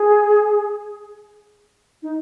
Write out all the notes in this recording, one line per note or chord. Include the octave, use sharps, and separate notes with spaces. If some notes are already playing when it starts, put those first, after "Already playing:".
Already playing: G#4
D#4